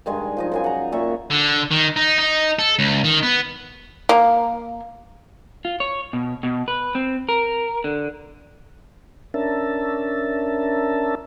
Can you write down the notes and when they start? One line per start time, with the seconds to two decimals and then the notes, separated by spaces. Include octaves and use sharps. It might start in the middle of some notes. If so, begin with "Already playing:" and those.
0.06 G2 D#3 G#3 G#5
0.37 F3 D#4 D#5
0.52 F#2 C#3 G#5
0.64 F#5 A#5
0.92 A#2 E5 C#6
1.30 D3
1.71 D#3
1.96 D#4
2.19 D#4
2.59 A4
2.79 C#2
3.04 D#3
3.23 B3
4.09 A#3
5.65 F4
5.80 C#5
6.13 B2
6.43 B2
6.68 B4
6.95 C4
7.29 A#4
7.84 D3
9.34 C#4 D4 A#4 E5 A5